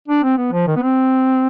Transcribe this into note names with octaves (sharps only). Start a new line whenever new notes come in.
D4
C4
B3
F3
D#3
B3
C4